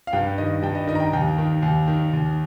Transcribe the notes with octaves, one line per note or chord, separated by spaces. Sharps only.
F5
G2 G5
D#3 D#5
G2 G5
D#5
D#3 D#5
A#5
G5
D#2 G5
D#3
D#2
D#3
D#2